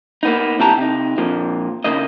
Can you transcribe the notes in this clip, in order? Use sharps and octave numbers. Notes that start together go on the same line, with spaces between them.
A#3 B3 D#4
C3 G3 E4 G4 A5 A#5
C3 D#4
F2 A#2 F3
C#3 E3 A#3 D#4 D#5